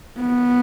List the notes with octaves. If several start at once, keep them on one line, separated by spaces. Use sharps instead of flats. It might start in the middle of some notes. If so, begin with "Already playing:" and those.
B3